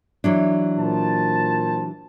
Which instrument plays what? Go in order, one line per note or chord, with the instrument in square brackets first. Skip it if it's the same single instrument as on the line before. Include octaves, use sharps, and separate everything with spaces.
[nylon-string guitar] E3 F#3 D4
[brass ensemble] A#2 C5 A5